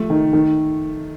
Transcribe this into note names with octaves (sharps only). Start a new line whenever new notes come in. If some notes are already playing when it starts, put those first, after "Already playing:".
Already playing: F3 A3
D#3
D#3